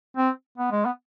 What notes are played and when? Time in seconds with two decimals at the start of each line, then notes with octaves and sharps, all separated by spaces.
0.17 C4
0.58 B3
0.71 G#3
0.85 B3